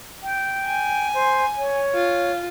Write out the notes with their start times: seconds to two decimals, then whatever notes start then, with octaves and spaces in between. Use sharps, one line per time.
0.23 G5
0.66 G#5
1.14 C5
1.57 C#5
1.95 F4